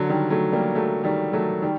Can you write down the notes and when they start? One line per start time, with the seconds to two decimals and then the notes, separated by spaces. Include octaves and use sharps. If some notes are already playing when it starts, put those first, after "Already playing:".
Already playing: D3 F#3
0.10 D#3 G3
0.30 F#3 A3
0.52 G3 A#3
0.75 F#3 A3
1.04 D#3 G3
1.33 F#3 A3
1.62 D#3 G3